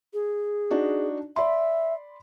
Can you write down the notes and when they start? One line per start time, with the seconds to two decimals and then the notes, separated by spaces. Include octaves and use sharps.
0.14 G#4
0.71 D4 D#4 F#4
1.36 D5 E5 B5 C6